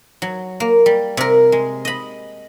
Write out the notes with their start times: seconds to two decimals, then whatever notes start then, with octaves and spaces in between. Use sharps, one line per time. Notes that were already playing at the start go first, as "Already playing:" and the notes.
0.22 F#3
0.60 A#3
0.86 G3
1.17 C3 A#4
1.52 G#3
1.85 D#5 B5